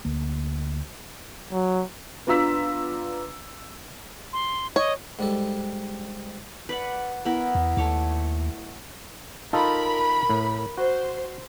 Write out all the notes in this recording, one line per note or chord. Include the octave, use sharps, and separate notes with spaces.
D2 A#3
F#3
B3 D4 F4 A#5 E6 B6
C6
C#5 D#5
G#2 G3 A4
B4 D5 F#5
B3 E4 A#4
E2
D#2 A3 C#5 D6
D#4 F4 A4 A#4 B5
A2
F#4 C5